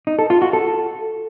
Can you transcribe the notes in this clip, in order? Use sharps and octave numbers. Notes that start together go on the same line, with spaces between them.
D#4
A4
F4
F#4
A4